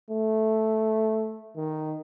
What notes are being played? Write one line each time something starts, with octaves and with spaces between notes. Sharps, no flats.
A3
D#3